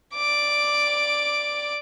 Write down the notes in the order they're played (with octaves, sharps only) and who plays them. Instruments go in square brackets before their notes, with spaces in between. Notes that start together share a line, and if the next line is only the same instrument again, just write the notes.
[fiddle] D5 D6